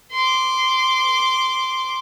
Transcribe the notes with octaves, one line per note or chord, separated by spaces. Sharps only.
C6 D6